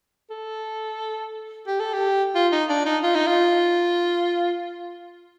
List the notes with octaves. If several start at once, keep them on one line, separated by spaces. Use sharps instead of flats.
A4
G4
A4
G4
F4
D#4
D4
D#4
F4
D#4
F4